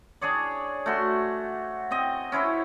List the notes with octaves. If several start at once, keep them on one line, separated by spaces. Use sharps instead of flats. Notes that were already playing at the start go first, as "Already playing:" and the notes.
D4 G#4 C#5 D5
A3 F#4 C6
C4 D#5
C#4 E4 C5 C#5